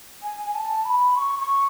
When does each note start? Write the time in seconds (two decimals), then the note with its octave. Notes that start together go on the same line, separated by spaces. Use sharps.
0.23 G#5
0.45 G#5
0.55 A5
0.85 B5
1.16 C#6
1.40 C#6